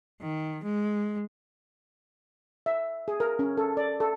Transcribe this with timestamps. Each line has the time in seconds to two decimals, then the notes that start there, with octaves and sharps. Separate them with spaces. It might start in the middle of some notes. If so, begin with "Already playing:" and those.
0.21 D#3
0.63 G#3
2.66 E5
3.08 G#4
3.20 A#4
3.39 C#4
3.57 A4
3.77 D5
4.00 A4